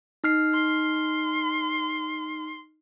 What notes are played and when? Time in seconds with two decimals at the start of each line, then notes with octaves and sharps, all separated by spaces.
0.24 D#4 F6 C7
0.54 C6